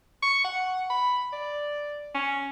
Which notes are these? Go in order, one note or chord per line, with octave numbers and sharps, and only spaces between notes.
C#6
F#5
B5
D5
C#4